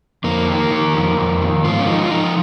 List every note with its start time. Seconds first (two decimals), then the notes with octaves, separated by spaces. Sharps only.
0.24 F2 A#3
0.47 D#3
0.71 D#3
0.94 F2
1.18 F2
1.40 D#3
1.64 G#2 F4
1.80 C#4
1.87 F3 D#4
2.04 F4
2.10 F3 D#4